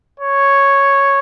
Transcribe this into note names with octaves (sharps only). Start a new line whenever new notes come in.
C#5